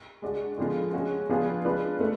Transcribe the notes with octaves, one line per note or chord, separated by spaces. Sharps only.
G#3 D4 F#4
D3 F3 G#3 B3 F4
G#3 C#4 F#4
F3 B3 D4 F4 G#4
G#3 D4 F4 B4
A3